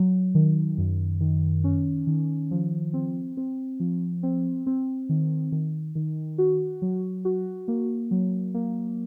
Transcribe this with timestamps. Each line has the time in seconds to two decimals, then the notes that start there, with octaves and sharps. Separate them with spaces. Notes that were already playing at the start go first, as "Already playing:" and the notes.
Already playing: F#3
0.35 D#3
0.78 F#2
1.21 D#3
1.64 C#4
2.07 D#3
2.51 F3
2.93 C4
3.37 C4
3.80 F3
4.23 C4
4.67 C4
5.09 D#3
5.52 D#3
5.95 D#3
6.38 F#4
6.82 F#3
7.25 F#4
7.68 A#3
8.11 F#3
8.54 A#3